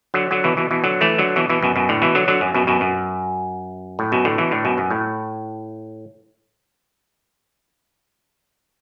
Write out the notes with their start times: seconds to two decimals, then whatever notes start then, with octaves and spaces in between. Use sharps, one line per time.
0.14 D3 F#3
0.31 D3 F#3
0.44 B2 E3
0.57 B2 E3
0.71 B2 E3
0.84 D3 F#3
1.01 E3 A3
1.18 D3 F#3
1.36 B2 E3
1.49 B2 E3
1.62 F#2 B2
1.76 F#2 B2
1.89 A2 D3
2.02 B2 E3
2.15 D3 F#3
2.28 D3 F#3
2.41 F#2
2.54 F#2 B2
2.67 F#2 B2
2.81 F#2
3.99 A2
4.12 F#2 B2
4.25 A2 D3
4.38 B2 E3
4.51 A2 D3
4.65 F#2 B2
4.78 F#2
4.90 A2